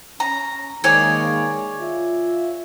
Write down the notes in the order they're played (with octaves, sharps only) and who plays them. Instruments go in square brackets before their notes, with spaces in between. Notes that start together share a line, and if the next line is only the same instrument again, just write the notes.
[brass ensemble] C#4 [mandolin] A#5
[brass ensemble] D#3 G#3 A#3 [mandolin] G#4 C#5 D5
[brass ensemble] F4 E5